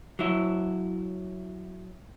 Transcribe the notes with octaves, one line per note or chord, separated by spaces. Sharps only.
F#3 E4